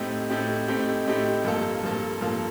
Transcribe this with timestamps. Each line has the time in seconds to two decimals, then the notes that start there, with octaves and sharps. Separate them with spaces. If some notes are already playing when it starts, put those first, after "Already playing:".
Already playing: A2 A3 C4 D#4 G4
0.30 A2 A3 C4 D#4 G4
0.68 A2 A3 C4 D#4 G4
1.06 A2 A3 C4 D#4 G4
1.45 G2 F3 A#3 F4 A4
1.83 G2 F3 A#3 F4 A4
2.21 G2 F3 A#3 F4 A4